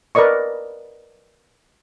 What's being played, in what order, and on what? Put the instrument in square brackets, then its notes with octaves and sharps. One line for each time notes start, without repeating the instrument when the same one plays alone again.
[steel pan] A#4 B4 D5 D#5 C#6